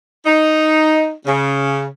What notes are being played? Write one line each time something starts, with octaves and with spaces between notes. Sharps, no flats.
D#4
C#3